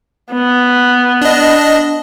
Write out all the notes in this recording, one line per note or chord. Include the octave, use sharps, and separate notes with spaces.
B3
D4 D#5